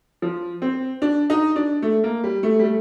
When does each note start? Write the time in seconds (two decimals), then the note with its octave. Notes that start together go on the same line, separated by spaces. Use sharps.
0.22 F3
0.62 C4
1.02 D4
1.30 D#4
1.56 D4
1.82 A3
2.04 A#3
2.24 G3
2.43 A3
2.59 G3
2.64 A3